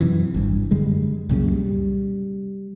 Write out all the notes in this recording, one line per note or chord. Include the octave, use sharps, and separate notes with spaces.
F#2 C3 E3
G#1 G2
F#2 D3 G3 G#3
C2 F#2 A#2 C#3
G3